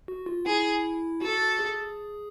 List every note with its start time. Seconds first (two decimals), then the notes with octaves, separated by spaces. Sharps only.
0.08 F#4
0.26 F4
0.46 E4 G#4
1.21 F#4 A4
1.59 G#4